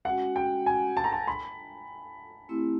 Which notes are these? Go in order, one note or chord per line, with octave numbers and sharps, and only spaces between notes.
G#3 C#4 F#4 F#5
G5
G#5
A5
A#5
A5
B5
A3 C4 E4 G4